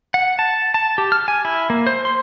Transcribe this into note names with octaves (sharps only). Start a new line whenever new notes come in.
F#5
A5
A5
G4
F6
G#5
E4
A#3
C5
C6